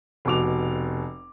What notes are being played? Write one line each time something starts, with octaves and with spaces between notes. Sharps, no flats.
F1 B2 D6 F7